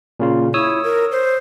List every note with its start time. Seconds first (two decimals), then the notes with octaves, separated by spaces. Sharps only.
0.20 A#2 C#3 F4
0.54 E4 C#5 D#6 E6
0.84 A#4
1.12 C5